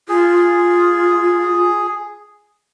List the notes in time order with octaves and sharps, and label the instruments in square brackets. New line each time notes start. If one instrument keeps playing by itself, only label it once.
[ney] F4 [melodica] G#4